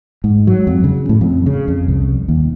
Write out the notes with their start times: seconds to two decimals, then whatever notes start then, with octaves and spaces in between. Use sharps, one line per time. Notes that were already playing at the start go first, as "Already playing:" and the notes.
0.24 G#2
0.47 F#3
0.67 F2
0.84 C#3
1.09 A2
1.21 F2
1.46 C#3
1.68 F2
1.88 C2
2.29 D#2